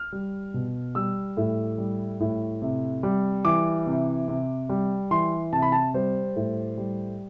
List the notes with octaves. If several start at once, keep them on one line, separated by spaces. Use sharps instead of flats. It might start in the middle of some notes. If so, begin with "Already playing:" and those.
Already playing: F6
G3
B2
G3 E6
A2
G3
A2
C3
G3
E3 D6
C3
C3
G3
E3 C6
C3 A5
B5
A5
G3 C5
A2
G3